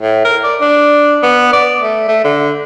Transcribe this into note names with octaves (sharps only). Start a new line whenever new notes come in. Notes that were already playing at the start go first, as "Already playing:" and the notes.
A2
A#4
D5
D4
B3
D5
A3
A3
D3